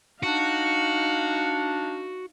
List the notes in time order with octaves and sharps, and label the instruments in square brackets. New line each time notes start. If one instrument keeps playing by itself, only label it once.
[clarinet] D4 [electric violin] D#4 F5 [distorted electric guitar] F#4